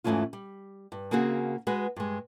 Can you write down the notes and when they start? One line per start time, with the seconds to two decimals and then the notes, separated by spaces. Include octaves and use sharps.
0.04 E2 G#2 E3 A3 C#4 F4
0.33 G3
0.92 G2
1.11 C#3 A#3 C4 F#4 G#4
1.67 G#3 F#4 B4
1.96 G2 G#3